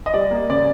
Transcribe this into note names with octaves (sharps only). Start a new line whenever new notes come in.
D#5
G3 D5
A#3
C#3 D5